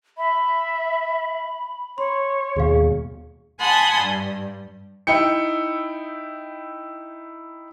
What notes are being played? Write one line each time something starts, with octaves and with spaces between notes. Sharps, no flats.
E5 B5
C#5 C6
D#2 B2 G#4 F5
F#5 G#5 A5 B5 C6 D#6
G2
D#4 E4 G5 C#7